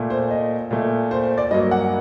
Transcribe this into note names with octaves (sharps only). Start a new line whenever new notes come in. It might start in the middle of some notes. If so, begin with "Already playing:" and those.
Already playing: A#2 A3
C5
D#5
A#2 A3
C5
C5
D5
G2 F#3 A#3 D#5
F#5